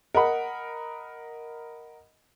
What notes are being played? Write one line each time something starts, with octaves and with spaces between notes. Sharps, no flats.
A#4 D#5 F#5 B5